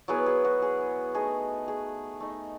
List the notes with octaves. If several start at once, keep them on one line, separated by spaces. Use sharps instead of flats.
F#3 B3 E4 G#4
G#4
F#4
G#4
A3 D#4 G#4
G#4
A3 D#4